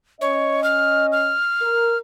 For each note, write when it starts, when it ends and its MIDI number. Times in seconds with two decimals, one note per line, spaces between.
0.21 1.34 61
0.21 0.63 73
0.21 1.34 75
0.64 1.06 89
1.12 1.98 89
1.62 1.96 70